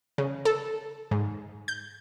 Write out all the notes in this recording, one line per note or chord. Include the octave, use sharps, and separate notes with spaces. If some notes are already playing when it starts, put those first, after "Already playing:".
C#3
A4
G#2
G6